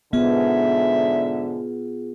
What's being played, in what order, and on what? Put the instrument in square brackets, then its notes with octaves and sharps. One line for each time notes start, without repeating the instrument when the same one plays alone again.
[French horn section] G#2 D3 [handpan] B3 [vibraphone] F4 G#4 [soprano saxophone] E5